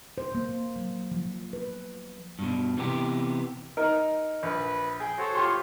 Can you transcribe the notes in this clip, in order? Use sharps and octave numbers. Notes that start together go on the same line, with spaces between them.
C5
A#3
F#3
F3
B4
G2 B2
C3 E3 B3 G4
D#4 A#4
A#1 B4
G#4 G5
F#4 A4 C5 C#5
F4 G4 C6